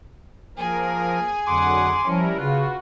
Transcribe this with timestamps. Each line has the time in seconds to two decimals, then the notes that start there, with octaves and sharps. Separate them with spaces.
0.57 F3 A#3 G#4 A#4 G#5
1.47 F2 D3 F#3 F#5 C6 D6
2.05 F3 G3 C#4 E4 A#4
2.38 C#3 F4 F#4 B4